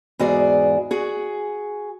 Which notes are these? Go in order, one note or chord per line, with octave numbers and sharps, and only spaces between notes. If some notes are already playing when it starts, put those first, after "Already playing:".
E2 G#2 F#4 G#4 D5
F#4 G#4